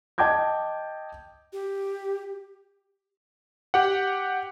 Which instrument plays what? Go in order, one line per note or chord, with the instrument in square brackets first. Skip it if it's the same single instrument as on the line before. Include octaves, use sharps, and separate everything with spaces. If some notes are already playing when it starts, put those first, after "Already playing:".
[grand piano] D#5 G5 A5 D6 G6 G#6
[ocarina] G4
[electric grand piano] G4 F#5